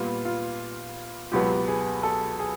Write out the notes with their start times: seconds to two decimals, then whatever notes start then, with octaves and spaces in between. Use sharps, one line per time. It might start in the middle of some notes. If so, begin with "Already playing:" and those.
Already playing: A#2 G3 B3 F4
0.25 F4
1.32 C#2 B2 F#3 B3 G4
1.68 G#4
2.03 A4
2.39 G#4